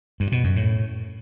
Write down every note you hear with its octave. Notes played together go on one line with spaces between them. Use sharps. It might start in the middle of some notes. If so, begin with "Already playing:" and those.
G2
B2
F#2
A2